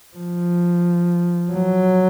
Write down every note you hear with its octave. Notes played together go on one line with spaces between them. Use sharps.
F3
F#3